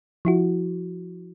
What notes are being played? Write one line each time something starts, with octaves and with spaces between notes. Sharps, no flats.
F3 E4 F#4